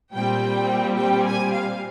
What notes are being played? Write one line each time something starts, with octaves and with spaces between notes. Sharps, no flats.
A#2 G3 C4 G5
G5
G#5
F5